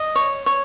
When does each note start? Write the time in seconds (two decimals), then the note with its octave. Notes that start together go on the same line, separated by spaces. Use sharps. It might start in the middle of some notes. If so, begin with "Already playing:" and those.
Already playing: D#5
0.15 C#5
0.46 C#5